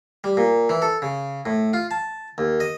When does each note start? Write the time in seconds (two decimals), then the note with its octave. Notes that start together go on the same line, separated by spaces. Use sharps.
0.24 G3
0.37 A#2
0.69 E3
0.82 A4
1.02 C#3
1.46 A2
1.73 F4
1.91 A5
2.38 D#2
2.60 D#5